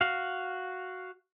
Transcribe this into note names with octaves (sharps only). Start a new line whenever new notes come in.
F#4 F5